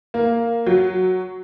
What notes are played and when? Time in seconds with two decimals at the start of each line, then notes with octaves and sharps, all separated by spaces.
0.14 A#3
0.66 F#3